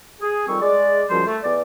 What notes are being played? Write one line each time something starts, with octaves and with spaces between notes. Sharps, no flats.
G#4
F2 D#3 G3 C4 C#6
G#3 D5
C#2 F#2 F3 G3 C5
A3
E2 D5